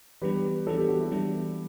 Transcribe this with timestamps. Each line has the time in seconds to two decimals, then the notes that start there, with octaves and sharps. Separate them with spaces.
0.22 E3 G3 B3 D4 G4 B4
0.67 E3 G3 B3 D4 A4
0.78 G4
0.88 F#4
1.00 E4 G4
1.12 E3 G3 B3 D4